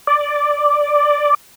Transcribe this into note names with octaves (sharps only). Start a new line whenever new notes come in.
D5